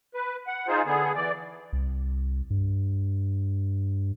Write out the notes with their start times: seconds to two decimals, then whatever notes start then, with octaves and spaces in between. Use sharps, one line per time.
0.14 B4
0.47 F#5
0.68 D#4 F4 G#4 C5
0.86 D3 B3 G#4
1.15 E3 D5
1.73 C2
2.50 G2